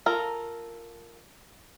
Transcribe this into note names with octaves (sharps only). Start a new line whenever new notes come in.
F4 A4 A#4